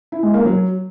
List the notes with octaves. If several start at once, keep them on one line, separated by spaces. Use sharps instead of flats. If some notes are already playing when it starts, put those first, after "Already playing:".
E4
G#3
A#3
F#3